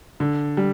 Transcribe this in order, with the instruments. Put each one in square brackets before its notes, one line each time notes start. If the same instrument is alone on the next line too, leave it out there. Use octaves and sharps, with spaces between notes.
[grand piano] D3
G3